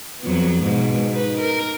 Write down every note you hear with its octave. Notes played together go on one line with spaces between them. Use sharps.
F2 F#3 B3
G#2 B2
D#4 B4
A#4